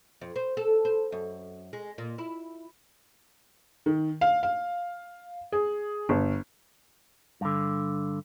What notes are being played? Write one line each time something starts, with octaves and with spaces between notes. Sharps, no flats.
F2
C5
A4
C5
F#2
G#3
A#2
E4
D#3
F5
F5
G#4
G1
G2 D3